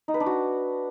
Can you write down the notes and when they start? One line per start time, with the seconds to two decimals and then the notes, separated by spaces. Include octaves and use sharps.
0.08 D#4
0.14 B4
0.20 D4
0.26 F#4